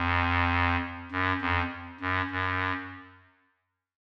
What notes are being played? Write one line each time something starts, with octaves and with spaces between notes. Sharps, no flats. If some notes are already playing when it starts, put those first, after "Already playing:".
Already playing: F2
F#2
F2
F#2
F#2